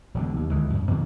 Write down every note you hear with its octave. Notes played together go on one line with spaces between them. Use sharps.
E1 B1 D3
D#2
D2 D#3 E3 G#3
F#2
B2 D#3 F#3 A#3